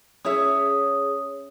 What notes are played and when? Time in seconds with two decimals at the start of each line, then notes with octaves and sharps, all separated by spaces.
0.25 C#4 G#4 C#5 E5 D#6